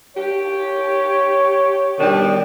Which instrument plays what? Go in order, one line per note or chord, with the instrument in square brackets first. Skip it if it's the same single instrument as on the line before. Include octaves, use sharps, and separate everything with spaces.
[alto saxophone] G4 [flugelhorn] C#5
[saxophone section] B2 D#3 G3 [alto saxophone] D4